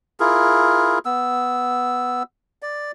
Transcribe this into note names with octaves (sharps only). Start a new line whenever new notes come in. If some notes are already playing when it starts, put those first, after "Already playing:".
E4 F4 G#4 A#4
B3 E6
D5